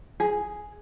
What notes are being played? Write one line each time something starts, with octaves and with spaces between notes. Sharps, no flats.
G#4